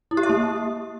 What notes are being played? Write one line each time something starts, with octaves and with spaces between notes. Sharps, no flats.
E4
G4
E5
A#3